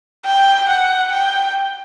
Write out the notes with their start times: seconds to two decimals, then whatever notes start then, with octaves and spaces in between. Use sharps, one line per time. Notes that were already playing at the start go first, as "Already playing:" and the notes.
0.25 G5
0.69 F#5
1.12 G5